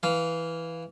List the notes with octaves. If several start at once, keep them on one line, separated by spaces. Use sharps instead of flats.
E3 F5